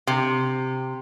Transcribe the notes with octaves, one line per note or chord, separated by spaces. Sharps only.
C3